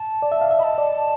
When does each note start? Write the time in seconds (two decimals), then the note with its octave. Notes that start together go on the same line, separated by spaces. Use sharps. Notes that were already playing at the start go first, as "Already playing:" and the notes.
Already playing: A5
0.22 D5
0.32 E5
0.41 F5
0.51 E5
0.59 D#5 B5
0.64 A5
0.78 D5